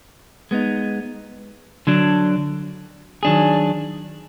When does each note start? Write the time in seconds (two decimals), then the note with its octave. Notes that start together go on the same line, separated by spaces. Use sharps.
0.51 G#3 B3 D#4
1.87 D3 F#3 D4
3.23 D#3 F#3 D4 G#4